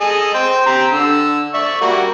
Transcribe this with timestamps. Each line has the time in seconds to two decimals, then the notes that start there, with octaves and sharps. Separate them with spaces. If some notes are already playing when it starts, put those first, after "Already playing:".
0.01 G#4 A4 D#5
0.34 C5 G5
0.66 C4 G4 A#5
0.92 D3 E6
1.54 D5 E5 C#6
1.81 G3 A#3 F#4